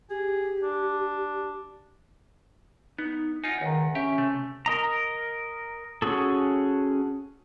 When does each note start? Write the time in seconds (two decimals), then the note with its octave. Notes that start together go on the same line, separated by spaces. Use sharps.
0.10 G4 G#4
0.62 D4
2.98 B3 D#4
3.44 D#4 F4 F#5 G#5
3.61 C#2 D#3
3.95 C#4 G4 E5
4.18 C3 A3
4.66 A#4 D#5 A#5
6.02 C#4 F#4 G#4 A4